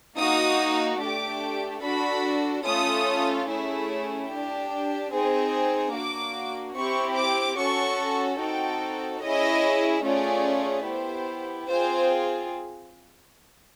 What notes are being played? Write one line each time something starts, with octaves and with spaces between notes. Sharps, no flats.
A#3 D#4 F#4 D#6
A3 D4 G4 D6
D4 F#4 A4 B5
A3 C#4 F4 A4 D#6
A3 C#4 E4 G#4
D4 G4
C4 D#4 G#4
A#3 D4 F#4 D6
C4 E4 G4 C#6
D6
C#4 F#4 A4 C#6
C4 D#4 F#4 A4 G5
C#4 E4 G#4 D#5
A3 C#4 F4 G#4 D5
B3 E4 G4 C5
C4 F4 G#4 C5